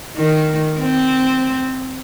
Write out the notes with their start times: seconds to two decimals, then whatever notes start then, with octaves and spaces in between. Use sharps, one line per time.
0.17 D#3
0.80 C4